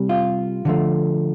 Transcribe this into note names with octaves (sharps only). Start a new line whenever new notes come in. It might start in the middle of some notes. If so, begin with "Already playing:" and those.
Already playing: C3 G3
F4
D3 F3 A3